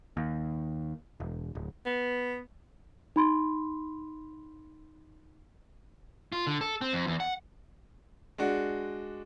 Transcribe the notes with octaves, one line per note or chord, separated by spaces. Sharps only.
D#2
E1
D1
B3
D#4 B5 C6
F4
D3
A4
C4
F2
E2
F#5
G#3 D4 F#4